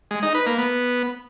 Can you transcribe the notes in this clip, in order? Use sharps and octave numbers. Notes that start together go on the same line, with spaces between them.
G#3
D#4
B4
A#3
B3